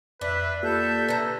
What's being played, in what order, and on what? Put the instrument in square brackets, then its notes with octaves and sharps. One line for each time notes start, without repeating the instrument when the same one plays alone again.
[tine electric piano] F2 B6 [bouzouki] D4 [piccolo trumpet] B4 [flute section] E5
[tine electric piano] A#3 F4 G4 [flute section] A4 A5 G6 [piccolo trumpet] E5
[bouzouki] D3 A#5 [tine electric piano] B4